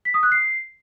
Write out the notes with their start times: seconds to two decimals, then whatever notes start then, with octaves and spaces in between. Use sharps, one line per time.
0.05 B6
0.14 D#6
0.23 F#6
0.32 C7